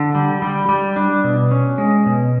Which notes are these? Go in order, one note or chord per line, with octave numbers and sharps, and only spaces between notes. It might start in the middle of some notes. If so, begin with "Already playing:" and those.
Already playing: D3
G3
G3
G3
D4
B2
C#4
G#3
B2